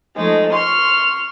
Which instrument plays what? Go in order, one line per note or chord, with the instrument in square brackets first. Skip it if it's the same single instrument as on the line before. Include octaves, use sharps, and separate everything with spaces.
[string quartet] F3 G#3 A3 D#4
C6 C#6 F6